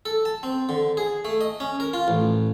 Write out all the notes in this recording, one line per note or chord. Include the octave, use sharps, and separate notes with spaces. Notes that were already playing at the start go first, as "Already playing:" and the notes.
A4
A5
C4
D3
G#4
A3
D#5
C#4
A#4
F4
A1